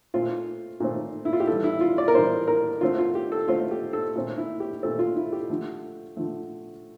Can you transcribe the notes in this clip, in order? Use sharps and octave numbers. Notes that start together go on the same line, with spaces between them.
A#2 A3 C4 F4
A#2 A3 C4
E4
F4
G4
A2 E3 G3 A4
E4
F4
D5
A#4
A2 E3 G3 C5
A#4
D3 A3 C4 F4
F4
G4
A4
D3 A3 C4 F4
G4
A4
A#2 A3 C4
E4
G4
A#2 A3 C4 A4
F4
E4
G4
D3 F3 A3
D3 F3 A3